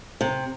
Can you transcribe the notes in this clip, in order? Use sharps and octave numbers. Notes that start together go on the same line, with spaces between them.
C3